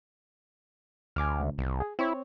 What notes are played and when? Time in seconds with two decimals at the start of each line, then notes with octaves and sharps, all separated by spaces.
1.16 D2 G#5 D6 F6
1.40 C#2
1.58 C2
1.80 G#4
1.99 C4 E4 C#5